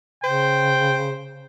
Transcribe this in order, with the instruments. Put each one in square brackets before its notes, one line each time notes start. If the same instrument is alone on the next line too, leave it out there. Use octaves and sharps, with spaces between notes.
[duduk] C#3 [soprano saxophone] C5 [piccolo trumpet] G5